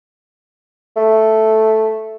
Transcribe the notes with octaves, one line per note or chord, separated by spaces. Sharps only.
A3